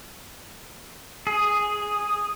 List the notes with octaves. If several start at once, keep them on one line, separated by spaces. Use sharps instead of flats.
G#4